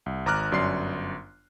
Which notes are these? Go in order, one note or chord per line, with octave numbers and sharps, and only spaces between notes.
C2
G#1 A#5 D6 F6 F#6
G1 F#2 D5 C6 C7